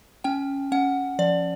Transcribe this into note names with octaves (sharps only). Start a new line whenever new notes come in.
C#4 G5
C#4 F#5
F3 D5